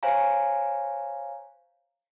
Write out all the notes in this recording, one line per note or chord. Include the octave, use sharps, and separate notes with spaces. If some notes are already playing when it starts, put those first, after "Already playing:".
C5 C#5 F5 G#5 A#5